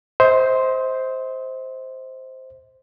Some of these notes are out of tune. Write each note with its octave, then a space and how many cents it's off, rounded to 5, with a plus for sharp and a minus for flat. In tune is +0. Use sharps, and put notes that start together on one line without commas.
C5 +0 D#5 +45